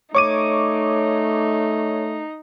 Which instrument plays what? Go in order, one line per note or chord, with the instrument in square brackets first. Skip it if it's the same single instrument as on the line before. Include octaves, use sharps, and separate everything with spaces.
[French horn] A3 [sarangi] D#4 [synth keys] C#5 [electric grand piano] C#6 D6 D#7